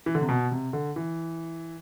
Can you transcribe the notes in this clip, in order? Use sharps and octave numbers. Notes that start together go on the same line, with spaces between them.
E3
D3
C3
B2
C3
D3
E3